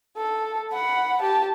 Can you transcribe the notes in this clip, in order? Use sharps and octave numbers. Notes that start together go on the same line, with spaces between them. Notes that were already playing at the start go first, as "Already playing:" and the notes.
A4
F#5 B5
G4 A5